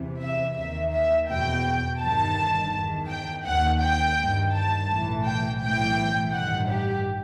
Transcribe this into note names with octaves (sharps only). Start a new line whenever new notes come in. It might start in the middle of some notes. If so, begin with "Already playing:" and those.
Already playing: E2 C3 E3
E5
D#2 D#3 E5
E5
E2 B2 G5
G1 G2 D#3 A5
E2 D#3
G5
D#2 D#3 F#5
G5
G1 G2 D#3
A5
B1 A2 E3
G5
B1 A2 E3 G5
A1 G2 D#3 F#5
G4